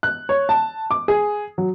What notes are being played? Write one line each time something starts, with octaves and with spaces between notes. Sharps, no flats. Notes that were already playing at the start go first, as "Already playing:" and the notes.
F#6
C#5
A5
D6
G#4
F#3